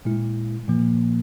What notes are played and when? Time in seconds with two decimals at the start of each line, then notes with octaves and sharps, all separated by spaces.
0.05 A#2 G#3 E4
0.68 A#2 F3 A#3